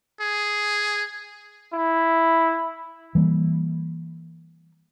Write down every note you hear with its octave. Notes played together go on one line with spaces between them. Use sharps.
G#4
E4
E3 G3 A#3